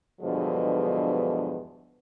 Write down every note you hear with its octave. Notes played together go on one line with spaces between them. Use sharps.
E2 G2 B2 D3 F3 G#3